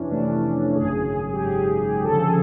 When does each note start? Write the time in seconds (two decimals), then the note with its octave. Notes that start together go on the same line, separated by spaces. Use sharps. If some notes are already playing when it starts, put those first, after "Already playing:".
Already playing: F2 C3 E3 C#4 D4
0.11 F2 C3 E3 A3 D4
0.75 G#1 F#2 C#3 G#4
1.33 G4
1.39 G#1 F#2 C#3 G#4
2.04 D2 C#3 F3 A4
2.19 G#4